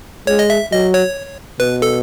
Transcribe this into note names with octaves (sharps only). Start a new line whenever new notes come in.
G#3 C#5
D#5
E5
F#3 D#5
C#5
B2 B4
A4